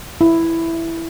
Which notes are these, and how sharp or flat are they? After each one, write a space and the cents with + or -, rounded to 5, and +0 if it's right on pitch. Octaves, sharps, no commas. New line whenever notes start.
E4 +5